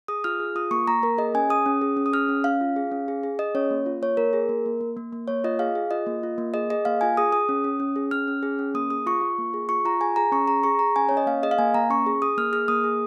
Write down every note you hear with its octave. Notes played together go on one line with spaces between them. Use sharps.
G#4 D#6
F4 F6
G#4
F4 D#6
A#3 C#6
A#3 A#5
A#3 A#4
G#4 D#5
C#4 G#5
G#4 D#6
C#4
G#4
C#4
D#6
G#4 F6
C#4
C#4 F5
F4
G#4
C#4
G#4
G#4
G#4 D#5
C#4 C#5
A#3
F4
A#3 C#5
A#3 A#4
G#4
A#3
A#3
A#3
A#3
A#3
A#3 C#5
F4 D#5
G#4 F5
G#4
F4 D#5
A#3
F4
A#3
G#4 D#5
G#4 D#5
A#3 F5
F4 G#5
G#4 D#6
G#4 D#6
C#4
C#4
C#4
G#4
C#4 F6
C#4
G#4
C#4
A#3 D#6
G#4 D#6
F4 C#6
F4
A#3
G#4
F4 C#6
F4 A#5
G#4 G#5
G#4 A#5
C#4 C#6
G#4 A#5
G#4 C#6
G#4 A#5
C#4 G#5
C#4 C#5
D#5
A#3 F5
G#4 D#5
F5
A#3 G#5
A#3 A#5
C#4 C#6
G#4
G#4 D#6
A#3 F6
G#4 F6
A#3 D#6
G#4